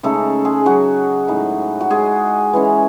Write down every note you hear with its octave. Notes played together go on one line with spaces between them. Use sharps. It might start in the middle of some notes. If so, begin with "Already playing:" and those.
C#3 G#3 A3 D#4 A4
G#3 G#4
F#3 F#4
A2 G#3 D#4
F#4
G#3 G#4
E3 G#3 C#4